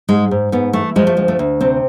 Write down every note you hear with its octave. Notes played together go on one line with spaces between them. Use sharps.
G#2 G#3
G#2
G#2 B3
E3 A3
F3 G#3
A3
D2 G#3
A3
D2
C3 C4